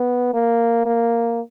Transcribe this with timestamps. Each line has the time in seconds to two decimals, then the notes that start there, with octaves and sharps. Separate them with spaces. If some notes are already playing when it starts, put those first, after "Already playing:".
Already playing: B3
0.34 A#3
0.86 A#3